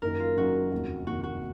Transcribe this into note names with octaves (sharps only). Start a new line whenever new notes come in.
F#1 F#2 D#3 A#4
F4
F#1 F#2 D#3 F#4
F1 D#2 D#3
F1 D#2 D#3 F#4
F#4